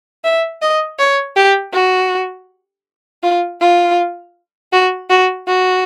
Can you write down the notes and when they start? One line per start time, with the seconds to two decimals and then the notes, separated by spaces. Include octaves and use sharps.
0.24 E5
0.62 D#5
0.99 C#5
1.36 G4
1.73 F#4
3.23 F4
3.61 F4
4.73 F#4
5.10 F#4
5.47 F#4